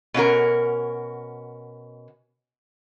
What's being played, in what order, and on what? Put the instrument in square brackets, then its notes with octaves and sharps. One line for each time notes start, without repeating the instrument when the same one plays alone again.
[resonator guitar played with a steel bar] B2 C#4 F#4 A#4